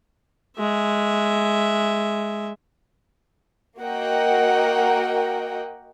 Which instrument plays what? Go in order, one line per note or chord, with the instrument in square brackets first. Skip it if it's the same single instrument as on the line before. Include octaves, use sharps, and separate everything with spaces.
[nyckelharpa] G#3 E5
[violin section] A#3 F#4 A#4 D#5 F#5 G5